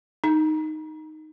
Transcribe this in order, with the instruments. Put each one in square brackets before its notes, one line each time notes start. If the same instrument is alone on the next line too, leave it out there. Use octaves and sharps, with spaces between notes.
[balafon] D#4